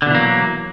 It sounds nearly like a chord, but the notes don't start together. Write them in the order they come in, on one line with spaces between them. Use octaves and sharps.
D3 B2 E3 A#3 F#3